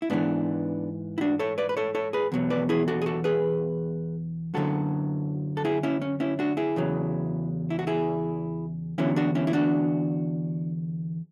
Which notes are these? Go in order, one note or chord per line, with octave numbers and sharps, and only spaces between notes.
E4
G#2 E3 B3 D4
E4
D4 F#4
A4 C#5
B4 D5
B4
A4 C#5
A4 C#5
G#4 B4
E2 B2 F#3
B4 D5
E4 G#4
F#4 A4
G#4
F#4 A4
G#4 B4
F#2 D3 F#3 F#4 A4
A4
E4 G#4
C#4 E4
C#4
C#4 E4
D4 F#4
E4 G#4
E2 C#3 F#3
E4
F#4
E4 G#4
E2 D3 F#3 C#4 E4
D4 F#4
C#4 E4
E4
D4 F#4